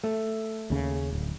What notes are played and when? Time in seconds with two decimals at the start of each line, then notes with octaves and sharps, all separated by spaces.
0.04 A3
0.70 D#2 C#3
1.12 D1